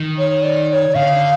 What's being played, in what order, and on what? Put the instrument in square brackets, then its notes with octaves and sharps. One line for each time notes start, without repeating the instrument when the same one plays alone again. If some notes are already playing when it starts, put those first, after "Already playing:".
Already playing: [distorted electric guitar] D#3
[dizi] C#5
D5
D5
C#5
[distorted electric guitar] D3 [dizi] F5